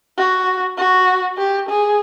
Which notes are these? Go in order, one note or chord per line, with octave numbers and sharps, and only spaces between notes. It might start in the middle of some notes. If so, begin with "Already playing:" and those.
F#4
F#4
G4
G#4